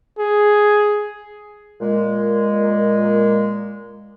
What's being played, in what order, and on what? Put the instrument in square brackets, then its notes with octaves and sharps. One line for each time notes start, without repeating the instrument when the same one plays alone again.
[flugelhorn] G#4
[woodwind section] A#2 G#3